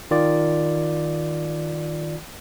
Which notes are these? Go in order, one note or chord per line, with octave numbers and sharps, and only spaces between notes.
D#3 F4 D5